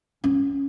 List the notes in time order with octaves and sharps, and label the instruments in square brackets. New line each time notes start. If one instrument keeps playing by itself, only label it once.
[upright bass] C#4